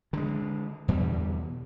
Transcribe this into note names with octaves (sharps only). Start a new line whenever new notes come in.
D3 G#3
E2 B2 D3 G3